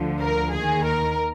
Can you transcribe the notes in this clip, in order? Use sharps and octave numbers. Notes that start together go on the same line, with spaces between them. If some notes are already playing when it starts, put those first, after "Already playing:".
Already playing: D2 D3 F3
A#4
D#2 D#3 G#4
A#4